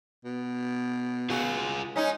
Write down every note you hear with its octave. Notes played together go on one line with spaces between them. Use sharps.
B2
F4 F#4 G#4
G#3 C#4 D#4